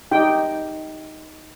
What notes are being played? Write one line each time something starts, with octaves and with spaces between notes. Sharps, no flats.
D#4 G4 G5